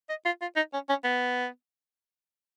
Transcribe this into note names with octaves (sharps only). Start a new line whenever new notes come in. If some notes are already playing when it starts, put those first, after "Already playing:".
D#5
F4
F4
D#4
C#4
C#4
B3